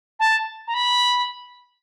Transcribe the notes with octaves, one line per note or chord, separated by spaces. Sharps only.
A5
A#5
B5